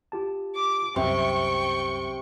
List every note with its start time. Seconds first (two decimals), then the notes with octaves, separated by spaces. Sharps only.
0.12 F4 G4 A5
0.55 D6
0.96 C2 F#2 C3 G5 C6 C#6